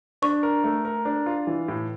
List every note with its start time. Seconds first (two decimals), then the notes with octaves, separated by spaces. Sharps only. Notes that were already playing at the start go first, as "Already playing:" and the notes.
0.22 D4 C#6
0.43 A#4
0.64 A3
0.85 A#4
1.05 D4
1.26 F4
1.47 E3
1.68 A2